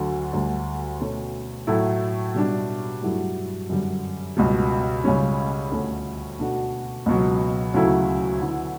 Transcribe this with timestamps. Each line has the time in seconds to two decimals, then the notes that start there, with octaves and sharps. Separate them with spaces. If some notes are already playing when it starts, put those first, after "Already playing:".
Already playing: D2 D3 F#3
0.33 D2 D3 G3
1.01 B2 A3 C#4
1.67 A2 F#3 A3 E4
2.34 B2 G3 D4
3.02 G2 F#3 A3 E4 G4
3.69 F#2 D3 G3
4.37 C#2 B2 G3
5.04 C#2 C#3 G3 C#4
5.71 D2 D3 A3 C#4
6.39 B2 A3 D4 F#4
7.06 C#2 B2 F#3
7.74 D2 C#3 F#3 A3 E4
8.41 D3 F#3 B3 E4